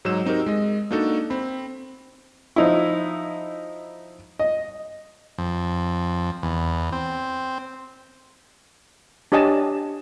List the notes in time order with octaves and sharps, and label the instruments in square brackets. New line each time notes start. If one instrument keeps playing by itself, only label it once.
[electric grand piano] G#2 F#3 D#4 E6 E7
C4 D#4 F#4 G4 A#4
G#3 D#5
A#3 D4 D#4 F#4 A4
C4 B5
[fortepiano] F3 D#4 E4
D#5
[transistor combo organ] F2
E2
C4
[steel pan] D4 G4 C#5 D#5 G#5 A5